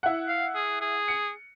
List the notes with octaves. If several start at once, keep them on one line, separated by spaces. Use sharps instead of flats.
E4 F#5
F5
G#4
G#4
C#7